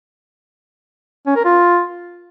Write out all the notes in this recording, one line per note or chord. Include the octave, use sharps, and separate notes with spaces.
C#4
A#4
F4